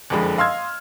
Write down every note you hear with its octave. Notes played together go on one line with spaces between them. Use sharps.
F#1 F2 D3 F3 G#3 B5
D#5 F5 C6 E6 F6 G#6